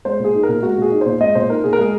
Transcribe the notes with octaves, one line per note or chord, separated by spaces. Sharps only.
G#3 C5
A#2 G#4
D#4
A#4
A#2
G#3 F#4
A#2 G#4
D#4
A#2 C5
G#3 D#5
A#2 C5
D#4 A#4
A#2 G#4
A#4
G#3 G#4